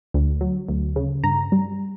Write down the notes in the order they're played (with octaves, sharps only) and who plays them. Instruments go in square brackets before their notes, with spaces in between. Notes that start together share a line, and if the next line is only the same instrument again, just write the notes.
[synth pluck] D2
F#3
D2
C#3
G2 A#5
G3